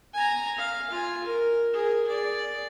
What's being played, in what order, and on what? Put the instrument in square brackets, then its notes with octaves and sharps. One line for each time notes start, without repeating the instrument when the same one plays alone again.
[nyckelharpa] G#5 A#5
F5
F4 G#5
A#4
G#4 A#4
G#4 D5